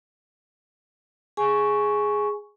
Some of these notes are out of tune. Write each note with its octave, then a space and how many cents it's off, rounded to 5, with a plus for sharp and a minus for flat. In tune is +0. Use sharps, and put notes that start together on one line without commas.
G#4 +0 G#5 +10 C#6 +0